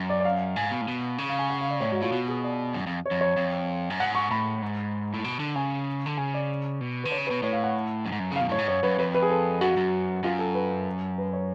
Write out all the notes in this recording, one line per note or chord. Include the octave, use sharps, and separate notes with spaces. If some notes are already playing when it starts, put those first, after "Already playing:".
Already playing: F#2
D5
D5
F5
G#2 G#5
B2
A2
B2
C#3
F5
G#5
F#5
F5
D5
A2 C#5
G#2 F#4
A2 F4
B2 F#4
G#4
D5
F#2
F2
C#5
F2
C#5
F2
F#2
G#2 F#5
C#6
A2 B5
G#2
A2
B2
D3
C#3 G#5
D3
C#3 G#5
D5
B2
D3 B4
C#5
C#3
B4
B2
A2 C#5
F5
F#5
F#2
G#2
F#2
C#3 F5
B2
A2 C#5
G#2
F#2 C#5
F#2 B4
F2 B4
B4
G#4
A4
F#2 F#4
F2
F#2
F#2 F4
A4
B4
B4
C#5